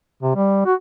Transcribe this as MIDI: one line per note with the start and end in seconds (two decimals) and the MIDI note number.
0.23 0.35 48
0.35 0.65 55
0.66 0.74 66